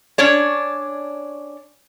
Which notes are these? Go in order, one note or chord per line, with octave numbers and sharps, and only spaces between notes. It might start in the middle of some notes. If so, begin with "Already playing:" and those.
C#4 D4 C#5 D5